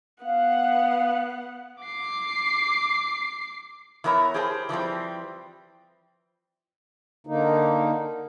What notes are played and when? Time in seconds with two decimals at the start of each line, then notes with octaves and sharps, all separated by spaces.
0.24 B3 F5 F#5
1.82 D6 C7
4.04 E3 B3 A#4 C#5 E5
4.34 G4 G#4 A#4 C5 F#5 A5
4.69 E3 F3 G3 C4
7.27 D3 A#3 D#4